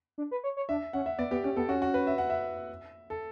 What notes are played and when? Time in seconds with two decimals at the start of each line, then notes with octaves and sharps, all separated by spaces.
0.18 D4
0.31 B4
0.44 C#5
0.57 C#5
0.69 D4 E5
0.93 C#4 F#5
1.06 E5
1.18 B3 D5
1.31 B3 G4
1.44 C#4 G4
1.56 B3 A4
1.68 C#4 F#4
1.82 F#4
1.94 B4
2.07 E5
2.18 F#5
2.30 E5
3.10 A4